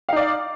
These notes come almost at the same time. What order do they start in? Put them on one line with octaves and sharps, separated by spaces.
F5 D#4 D5